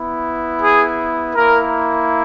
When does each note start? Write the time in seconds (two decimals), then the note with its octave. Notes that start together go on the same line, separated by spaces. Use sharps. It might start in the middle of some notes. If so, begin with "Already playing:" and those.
Already playing: B3 E4
0.62 G#4
1.35 A#3 E4 A#4